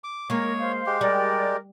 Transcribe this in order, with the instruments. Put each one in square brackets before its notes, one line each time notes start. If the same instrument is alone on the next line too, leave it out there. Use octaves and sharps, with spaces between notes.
[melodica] D6
[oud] G#3 A#3 [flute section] A#4 [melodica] C#5
[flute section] C5 F5
[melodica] G#3 G4
[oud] G3 [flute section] A#4 D5